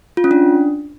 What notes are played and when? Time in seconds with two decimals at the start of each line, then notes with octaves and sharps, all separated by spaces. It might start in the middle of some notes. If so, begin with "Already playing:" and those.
0.17 F4
0.24 C#4
0.31 D4